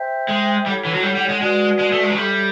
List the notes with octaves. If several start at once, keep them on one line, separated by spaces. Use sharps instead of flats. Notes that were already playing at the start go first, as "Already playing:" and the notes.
Already playing: C5 E5 G5
G#3
G3 E4 A4 C#5 F#5
E3
F#3
G3
G3
G#3
G#3 F#4 B4 D5
G#3
A3
G#3
F#3
G3 A4 C#5 E5